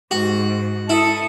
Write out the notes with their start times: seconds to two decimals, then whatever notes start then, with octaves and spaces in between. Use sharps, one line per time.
0.11 G#2 F#4
0.89 E4 A4 D#6